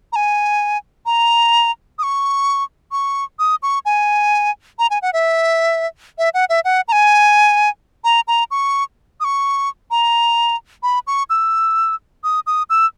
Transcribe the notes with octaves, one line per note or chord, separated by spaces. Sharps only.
A#5
G#5
A#5
D#6
C#6
C#6
D#6
C#6
G#5
A#5
G#5
F#5
E5
E5
F#5
E5
F#5
A#5
G#5
A#5
A#5
C#6
D#6
C#6
A#5
B5
C#6
E6
D#6
D#6
E6